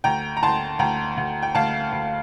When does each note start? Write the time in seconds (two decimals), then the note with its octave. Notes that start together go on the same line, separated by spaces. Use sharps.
0.04 D2 G5 A#5
0.37 A#5
0.43 D2 A5 C6
0.79 D2 G5 A#5
1.17 D2
1.42 G5
1.55 D2 F5 A5
1.92 D2